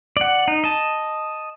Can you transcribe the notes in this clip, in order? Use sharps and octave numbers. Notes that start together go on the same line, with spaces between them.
D5 F#5
D#4
D#5 A5